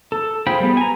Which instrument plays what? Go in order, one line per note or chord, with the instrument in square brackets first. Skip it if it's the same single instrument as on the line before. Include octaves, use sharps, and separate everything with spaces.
[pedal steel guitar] A4
F4 G#4 C5 G5 B5
G3 B3
G#5 A#5